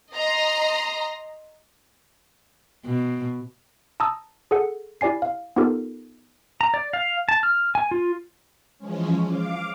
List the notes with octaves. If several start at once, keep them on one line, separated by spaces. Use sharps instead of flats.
D#5 A#5 C6 A#6
B2
A5 A#5 D#6 E6
G#4 A4 F#5
E4 G4 D5 G#5 C7
F5
B3 D#4 F4 G4 A4 A#4
A#5
D5
F5
A5
F6
G#5
F4
E3 F3 G#3 C#4
F5 D6